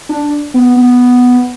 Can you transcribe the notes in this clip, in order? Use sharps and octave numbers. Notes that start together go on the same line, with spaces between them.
D4
B3
B3